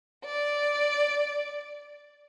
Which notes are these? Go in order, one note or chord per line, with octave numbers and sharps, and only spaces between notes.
D5